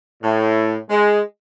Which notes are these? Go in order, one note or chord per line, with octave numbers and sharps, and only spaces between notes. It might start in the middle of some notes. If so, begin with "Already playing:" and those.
A2
G#3